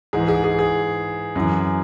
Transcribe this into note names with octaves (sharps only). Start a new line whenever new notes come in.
G#2 E3 G#4
G#4
G#4
G#4
F#2 E3